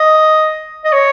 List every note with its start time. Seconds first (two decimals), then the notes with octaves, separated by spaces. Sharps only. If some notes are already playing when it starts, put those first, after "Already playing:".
Already playing: D#5
0.85 D#5
0.92 C#5